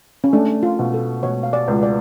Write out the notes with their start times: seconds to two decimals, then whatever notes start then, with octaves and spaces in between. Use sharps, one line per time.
0.24 C#4
0.33 A3 D4
0.63 F4
0.79 B2
0.94 A4
1.23 B2 C#5
1.43 F5
1.53 D5
1.68 C#2
1.83 D5